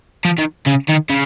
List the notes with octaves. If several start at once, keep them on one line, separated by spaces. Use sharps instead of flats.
F3
D#3
C#3
D#3
C#3